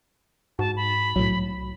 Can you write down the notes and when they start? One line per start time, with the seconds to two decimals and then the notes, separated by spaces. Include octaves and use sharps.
0.59 G#2 F#4 A5
0.76 B5
1.16 C2 A2 F#3